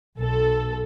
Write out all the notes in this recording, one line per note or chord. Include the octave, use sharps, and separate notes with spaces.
B1 A4